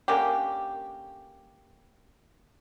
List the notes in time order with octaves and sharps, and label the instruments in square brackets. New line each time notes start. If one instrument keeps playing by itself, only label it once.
[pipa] D3 A#3 C#4 G4